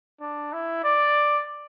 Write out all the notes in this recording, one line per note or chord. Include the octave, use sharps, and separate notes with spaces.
D4
E4
D5